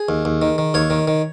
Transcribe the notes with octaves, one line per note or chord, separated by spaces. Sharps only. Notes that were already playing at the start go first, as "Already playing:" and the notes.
Already playing: G#4
D#2
D#2
D#3
D#3
D#2 C#5
D#3
D#3